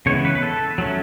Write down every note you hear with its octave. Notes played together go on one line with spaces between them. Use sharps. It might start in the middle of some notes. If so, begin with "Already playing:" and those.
C#3 E3 G#3 B3 C#5
B4
B4
A4
F#3 A3 C#4